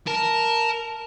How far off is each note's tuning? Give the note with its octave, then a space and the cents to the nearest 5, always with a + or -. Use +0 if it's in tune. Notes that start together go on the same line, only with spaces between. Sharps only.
A#4 +0 A5 +0